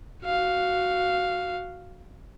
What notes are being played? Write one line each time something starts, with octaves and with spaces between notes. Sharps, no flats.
F#4 F5